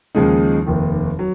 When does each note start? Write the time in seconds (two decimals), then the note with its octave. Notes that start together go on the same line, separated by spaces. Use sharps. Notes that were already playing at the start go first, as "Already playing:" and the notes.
0.15 D#2 C#3 F3 G#3 D#4
0.66 F1 D#2 D#3
1.19 F#3